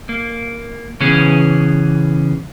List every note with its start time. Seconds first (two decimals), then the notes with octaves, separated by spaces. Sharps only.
0.09 A#3
1.00 C#3 E3 B3 C#4 G#4